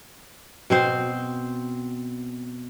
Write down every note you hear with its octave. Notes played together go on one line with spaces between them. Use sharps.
B2 C4 C5